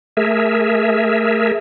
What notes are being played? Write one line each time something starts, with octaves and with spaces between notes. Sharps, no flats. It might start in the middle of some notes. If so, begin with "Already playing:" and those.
A3 G#4 A#4 E5